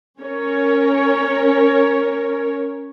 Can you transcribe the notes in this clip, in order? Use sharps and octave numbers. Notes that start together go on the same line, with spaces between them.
C#4 A#4 C#5